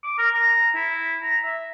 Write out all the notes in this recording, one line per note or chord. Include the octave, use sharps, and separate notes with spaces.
D6
A#4
A#5
E4
A#5
E5